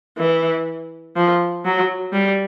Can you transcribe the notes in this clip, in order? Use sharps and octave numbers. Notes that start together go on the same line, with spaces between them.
E3
F3
F#3
G3